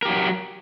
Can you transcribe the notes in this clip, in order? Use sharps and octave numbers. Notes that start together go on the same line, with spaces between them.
F#3 G4 A#4